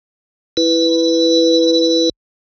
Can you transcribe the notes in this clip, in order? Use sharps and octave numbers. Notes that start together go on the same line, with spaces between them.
E4 B4